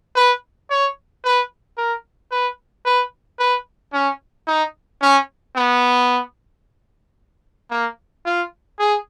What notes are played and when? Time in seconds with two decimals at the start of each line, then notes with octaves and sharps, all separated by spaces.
0.16 B4
0.70 C#5
1.24 B4
1.78 A#4
2.31 B4
2.86 B4
3.39 B4
3.93 C#4
4.47 D#4
5.02 C#4
5.56 B3
7.71 A#3
8.26 F4
8.79 G#4